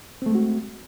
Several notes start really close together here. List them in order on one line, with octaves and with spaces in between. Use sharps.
C4 A3 G#3 F#4